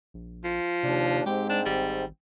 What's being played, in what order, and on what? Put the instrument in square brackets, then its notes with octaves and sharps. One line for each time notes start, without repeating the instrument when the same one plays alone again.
[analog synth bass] A#1
[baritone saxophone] F3
[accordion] D#2 D4 [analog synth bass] C3
[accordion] G#2 C4 [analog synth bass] G#3 [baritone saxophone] G4
[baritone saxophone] D4
[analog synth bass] G#1 [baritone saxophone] G3